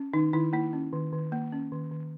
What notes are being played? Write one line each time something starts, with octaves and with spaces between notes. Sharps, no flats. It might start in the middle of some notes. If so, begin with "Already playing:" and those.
Already playing: C#4
D#3 D#4
D#3 E4
A#3 E4
C#4
D#3
D#3
A#3
C#4
D#3
D#3